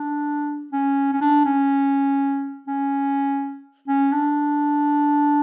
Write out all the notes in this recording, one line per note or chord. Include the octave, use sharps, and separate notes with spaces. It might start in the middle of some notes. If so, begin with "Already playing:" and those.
Already playing: D4
C#4
C#4
D4
C#4
C#4
C#4
D4